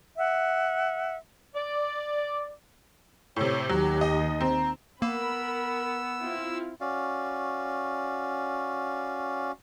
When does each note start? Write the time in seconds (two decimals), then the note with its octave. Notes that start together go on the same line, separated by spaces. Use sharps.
0.17 E5 F#5
1.55 D5
3.36 A2 C3 C#5
3.69 D#2 F#3 G4
4.01 D#5
4.41 C4 A#5
5.02 A#3 B3 A#4 B5 E6
6.21 C4 E4 F4
6.81 C#4 F#4 D5 F5